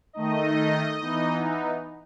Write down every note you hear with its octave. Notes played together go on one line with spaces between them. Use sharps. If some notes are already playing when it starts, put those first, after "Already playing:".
D#3 A3 D#4 D#5
E3 B3 D#4